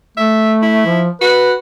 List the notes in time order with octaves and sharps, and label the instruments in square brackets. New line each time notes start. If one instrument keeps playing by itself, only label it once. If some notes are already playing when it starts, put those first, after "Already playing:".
[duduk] A3 [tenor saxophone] E5
[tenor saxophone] E4
[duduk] F3
[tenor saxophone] F#4 [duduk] B4